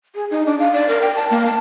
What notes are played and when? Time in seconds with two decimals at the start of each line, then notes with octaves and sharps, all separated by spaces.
0.15 G#4
0.31 D#4
0.46 D4
0.59 F5
0.73 D5
0.88 A#4
1.02 G5
1.15 A5
1.31 A#3
1.46 A5